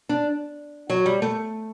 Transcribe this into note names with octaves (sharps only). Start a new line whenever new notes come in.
D4
F#3
G3
A3